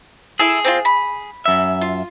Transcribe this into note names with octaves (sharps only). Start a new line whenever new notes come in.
E4 G#4 A4 E6
C4 D#4 F4
B5
F#2 E5
F4